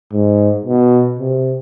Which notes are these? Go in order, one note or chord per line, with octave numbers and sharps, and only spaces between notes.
G#2
B2
C3